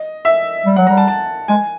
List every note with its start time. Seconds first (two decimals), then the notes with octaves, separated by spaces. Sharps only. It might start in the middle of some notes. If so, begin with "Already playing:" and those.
Already playing: D#5
0.25 E5
0.66 G3
0.76 F#3 F#5
0.87 G3 A#5
0.97 A5
1.08 A5
1.48 G#3 G#5